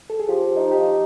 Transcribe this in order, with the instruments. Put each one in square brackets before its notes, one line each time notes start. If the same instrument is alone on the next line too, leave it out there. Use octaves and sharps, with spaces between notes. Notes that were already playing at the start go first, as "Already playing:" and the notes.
[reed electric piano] A4
G#4
[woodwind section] F3 [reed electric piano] G4
[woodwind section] D#4
[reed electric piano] G4